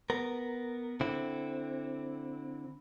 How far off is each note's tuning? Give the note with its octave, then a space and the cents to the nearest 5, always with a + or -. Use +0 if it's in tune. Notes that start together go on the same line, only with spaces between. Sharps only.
B3 +0 A#4 +0
D3 -5 C4 +0 E4 +0